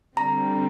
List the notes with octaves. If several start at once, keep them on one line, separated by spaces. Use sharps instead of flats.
D3 G3 C4 A#5